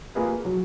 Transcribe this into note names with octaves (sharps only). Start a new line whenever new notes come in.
A#3 F4 G#4 B4
F#3